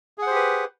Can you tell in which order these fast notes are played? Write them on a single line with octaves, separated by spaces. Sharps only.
G#4 F#5 C5 G4 B4